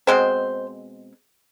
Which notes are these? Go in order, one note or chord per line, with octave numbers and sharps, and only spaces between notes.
B2 G#3 C4 C5